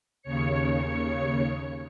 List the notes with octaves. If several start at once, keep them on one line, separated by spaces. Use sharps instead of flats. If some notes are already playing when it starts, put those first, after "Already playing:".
D#2 C#3 C#5 C#7